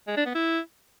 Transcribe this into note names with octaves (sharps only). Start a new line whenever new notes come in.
G#3
D4
B3
E4